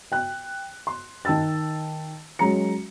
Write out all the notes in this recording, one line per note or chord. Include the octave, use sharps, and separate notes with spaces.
G5 F#6
C6
D#3 G5 A5 E6 A6
F#3 G#3 C#4 A#5 C#7